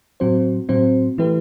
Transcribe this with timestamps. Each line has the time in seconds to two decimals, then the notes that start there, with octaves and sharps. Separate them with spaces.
0.20 A2 F#3 C4 F#4 C5
0.69 A2 F#3 C4 F#4 C5
1.18 E3 A3 E4 G4 B4